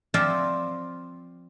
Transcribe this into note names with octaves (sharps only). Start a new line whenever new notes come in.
F3 C4 F4 C5 D5 E5